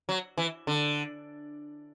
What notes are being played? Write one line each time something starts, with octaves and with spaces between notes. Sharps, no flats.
F#3
E3
D3